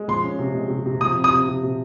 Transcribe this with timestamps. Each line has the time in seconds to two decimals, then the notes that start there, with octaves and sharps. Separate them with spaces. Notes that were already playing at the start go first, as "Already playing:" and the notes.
Already playing: G#3
0.08 F3 C6
0.24 C#4
0.39 C3
0.55 G#3
0.70 C3
0.86 C3
1.01 F3 D#6
1.16 C4
1.24 D#6
1.31 C3
1.48 C3
1.63 C3